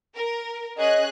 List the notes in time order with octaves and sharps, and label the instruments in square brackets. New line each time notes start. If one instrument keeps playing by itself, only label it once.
[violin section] A#4
[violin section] C#4 G#4 F#6 [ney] D#5